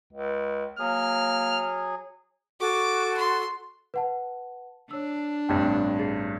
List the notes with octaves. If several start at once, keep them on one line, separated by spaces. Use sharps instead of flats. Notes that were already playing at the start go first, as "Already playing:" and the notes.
C#2
F#3 A#3 G#4 F6
F#4 A4 C#6 D6
C6
B4 F#5 A5
D4 C#5 E6
A1 G2 C3 D5 G5
G#4 A6 C7